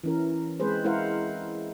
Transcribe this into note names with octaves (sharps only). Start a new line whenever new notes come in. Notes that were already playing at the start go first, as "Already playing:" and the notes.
E3 C#4 A#4
G#3 C4 G#4 B4 C5
G#3 E4 A#4 C5 F5 F#5